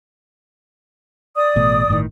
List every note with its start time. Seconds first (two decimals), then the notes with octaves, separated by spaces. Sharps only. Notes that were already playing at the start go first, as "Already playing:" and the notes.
1.36 D5 D#6
1.56 A1 B2 A3
1.88 G1 A2 D#3